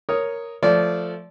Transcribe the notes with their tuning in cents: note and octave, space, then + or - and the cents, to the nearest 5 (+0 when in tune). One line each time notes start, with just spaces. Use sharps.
A#4 +0 C#5 +0 D#6 +0
F3 -5 A3 +0 D5 -20